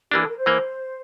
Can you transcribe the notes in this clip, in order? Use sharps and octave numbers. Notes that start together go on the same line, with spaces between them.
E3 A#3 D4 G4
A4
A#4
C5
E3 A#3